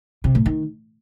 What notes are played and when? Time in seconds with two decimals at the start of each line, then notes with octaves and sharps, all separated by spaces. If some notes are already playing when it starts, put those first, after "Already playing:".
0.24 C3
0.35 A2
0.46 D#3